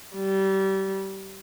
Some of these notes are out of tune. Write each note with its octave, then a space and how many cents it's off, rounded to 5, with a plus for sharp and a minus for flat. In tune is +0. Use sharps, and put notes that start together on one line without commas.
G3 -25